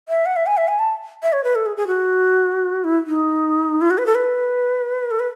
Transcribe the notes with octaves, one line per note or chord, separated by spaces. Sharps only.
E5
F#5
E5
G#5
E5
G#5
A5
E5
C#5
B4
A4
G#4
G#4
F#4
E4
D#4
E4
F#4
B4
A4
B4
A4
B4